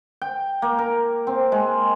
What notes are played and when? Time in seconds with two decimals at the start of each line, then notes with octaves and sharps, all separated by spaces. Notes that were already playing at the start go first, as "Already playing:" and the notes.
0.22 G5
0.62 A#3
0.79 A#4
1.27 C4
1.52 G#3